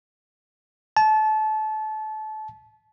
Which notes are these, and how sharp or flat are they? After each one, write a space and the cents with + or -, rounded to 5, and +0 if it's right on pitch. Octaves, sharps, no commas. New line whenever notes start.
A5 -25